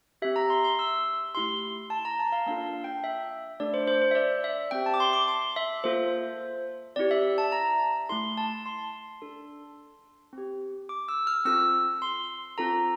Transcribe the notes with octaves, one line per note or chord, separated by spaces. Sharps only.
C4 G4 E5
A#5
C6
C6
E6
A3 E4 G4 C6
A5
A#5
A5
F5
A#3 D4 F4 A4 F5
G5
E5
A3 D4 A4 D5
C5
C5
C5
E5
D5
E5
C4 G4 G5
A5
D6
C6
D6
C6
E5
A#3 F4 A4 C5
C4 E4 G4 D5
E5
A5
A#5
A3 E4 A4 C6
A5
C6
D4 A4
C4 G4
D6
E6
F6
C4 F4 A4 E6
C6
C4 F4 A4 A#5